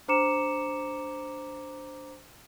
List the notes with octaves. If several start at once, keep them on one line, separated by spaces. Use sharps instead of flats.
D4 C5 A#5 D6 C#7 E7